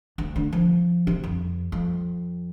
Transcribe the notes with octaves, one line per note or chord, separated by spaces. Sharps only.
D2
D3
F3
C3
F2
F2